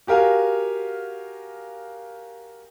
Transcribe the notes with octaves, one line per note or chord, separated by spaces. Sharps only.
F#4 G4 A#4 F5 G#5